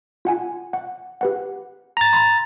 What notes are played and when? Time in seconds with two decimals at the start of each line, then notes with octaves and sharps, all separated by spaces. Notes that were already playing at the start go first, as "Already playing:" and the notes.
0.25 F4 F#5 G#5
0.73 F#5
1.21 G4 B4 F#5
1.97 A#5 A6
2.13 B5 C6